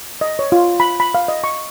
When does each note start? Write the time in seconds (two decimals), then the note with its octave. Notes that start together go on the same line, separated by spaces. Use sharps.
0.21 D#5
0.39 C#5
0.52 F4
0.80 B5
1.00 B5
1.15 F5
1.28 D#5
1.44 C#6